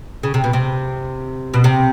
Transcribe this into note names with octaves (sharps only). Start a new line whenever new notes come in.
C#3
C3
B2
C3
B2
C3